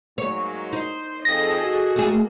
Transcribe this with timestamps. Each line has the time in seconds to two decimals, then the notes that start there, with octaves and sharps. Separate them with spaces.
0.18 G#2 F#3 A#3 C#5
0.73 D#4 C5
1.25 F2 G#4 A4 D#5 A#6
1.62 F#4
1.96 A3 A#3 G#4